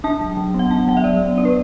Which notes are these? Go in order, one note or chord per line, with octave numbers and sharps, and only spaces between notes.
D4 A5
F#3
F#3
B3
F#5
D4 A5
F#3 F#5
E5
F#3 D5
B3
D4 D5
B4